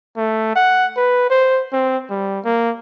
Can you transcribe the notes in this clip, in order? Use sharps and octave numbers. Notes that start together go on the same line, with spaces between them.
A3
F#5
B4
C5
C4
G3
A#3